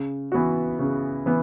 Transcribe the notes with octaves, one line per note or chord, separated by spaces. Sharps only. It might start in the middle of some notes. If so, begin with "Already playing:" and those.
Already playing: C#3
E3 B3 F#4
C#3
E3 B3